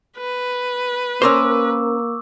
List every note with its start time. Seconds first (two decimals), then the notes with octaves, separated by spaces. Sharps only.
0.18 B4
1.22 A#3 C#4 A#4 C5 C#6 D6 E6